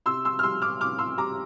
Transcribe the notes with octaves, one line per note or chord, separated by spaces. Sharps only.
C3 C6 E6
C6 E6
F6
G3 C6 E6
D6 F6
C3 D6 F6
C6 E6
G3 A#5 D6